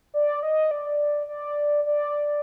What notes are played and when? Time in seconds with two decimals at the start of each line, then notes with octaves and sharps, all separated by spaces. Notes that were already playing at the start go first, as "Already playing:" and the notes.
0.14 D5
0.43 D#5
0.71 D5
1.29 D5
1.86 D5